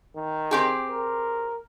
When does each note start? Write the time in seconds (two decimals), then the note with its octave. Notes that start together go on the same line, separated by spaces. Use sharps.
0.16 D#3
0.51 C4 G4 G#4
0.91 A#4